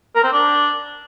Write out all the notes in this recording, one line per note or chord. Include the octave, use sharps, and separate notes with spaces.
A#4
C4
D4